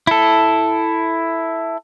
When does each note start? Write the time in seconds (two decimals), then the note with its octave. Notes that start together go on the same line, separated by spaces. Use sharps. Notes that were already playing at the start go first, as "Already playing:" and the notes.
0.07 E4 A4